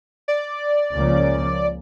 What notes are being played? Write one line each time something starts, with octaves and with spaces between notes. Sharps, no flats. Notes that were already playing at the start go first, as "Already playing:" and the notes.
D5
C#2 C#3 F3 A#3 C#4